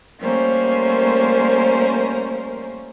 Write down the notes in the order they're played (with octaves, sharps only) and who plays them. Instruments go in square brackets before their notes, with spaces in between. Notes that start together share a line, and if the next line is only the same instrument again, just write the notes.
[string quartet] G3 A3 A#3 C#4 A#4 C5